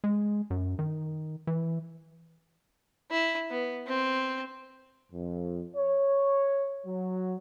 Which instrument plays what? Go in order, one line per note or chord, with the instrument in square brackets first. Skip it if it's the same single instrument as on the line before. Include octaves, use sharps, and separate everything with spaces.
[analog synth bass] G#3
F#2
D#3
E3
[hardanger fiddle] E4
B3
C4
[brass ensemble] F2
C#5
F#3